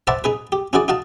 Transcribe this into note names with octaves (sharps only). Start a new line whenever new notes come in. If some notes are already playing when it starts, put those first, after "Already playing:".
B4 C5 D5 E5 F#5 A5
D#4 G#4 B4
G4
C#4 E4 F#4 G#4 D5
D#4 F#4 F5 A5